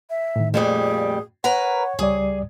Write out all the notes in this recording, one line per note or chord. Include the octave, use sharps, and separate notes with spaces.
E5
A2 D#3
F2 A#2 G3 A3 G#4
A#4 B4 C#5 F#5 A#5
C#2 G3 G#4 D5